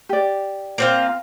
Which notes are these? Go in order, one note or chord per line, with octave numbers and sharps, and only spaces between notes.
G4 D5
A#3 C4 F4